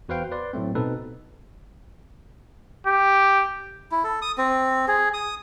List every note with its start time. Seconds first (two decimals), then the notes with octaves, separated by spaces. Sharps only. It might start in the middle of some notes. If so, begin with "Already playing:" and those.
0.09 E2 F#4 B4 C5 F5 G5
0.31 B4 D5 C6
0.53 A2 F#3 A3 C4
0.75 B2 C4 D#4 A4 B4
2.87 G4
3.92 E4
4.04 A4
4.22 D#6
4.38 C4
4.88 G#4
5.14 D#6